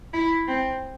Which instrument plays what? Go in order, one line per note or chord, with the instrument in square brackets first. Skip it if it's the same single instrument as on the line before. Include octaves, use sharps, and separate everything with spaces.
[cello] E4
C4